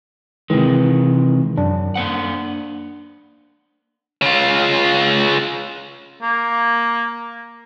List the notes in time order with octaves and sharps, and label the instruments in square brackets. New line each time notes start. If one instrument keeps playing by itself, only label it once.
[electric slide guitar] C3 G#3 [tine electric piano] D#3 E3
[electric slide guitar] F#2 [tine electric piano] D4
[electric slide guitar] A#3 C5 F#5
[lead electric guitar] C#3 F4
[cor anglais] A#3